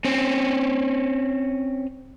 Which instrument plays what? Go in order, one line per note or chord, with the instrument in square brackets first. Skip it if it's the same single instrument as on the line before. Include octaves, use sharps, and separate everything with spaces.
[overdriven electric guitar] C4 C#4